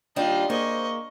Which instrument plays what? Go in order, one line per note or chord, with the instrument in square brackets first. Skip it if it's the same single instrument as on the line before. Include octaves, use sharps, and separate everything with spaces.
[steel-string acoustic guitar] D#2 G3 D4 [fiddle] F4 D#5
[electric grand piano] A#3 G#4 [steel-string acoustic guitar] C5 [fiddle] D#5 C#6